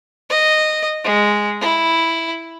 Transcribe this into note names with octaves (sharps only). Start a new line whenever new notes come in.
D#5
G#3
E4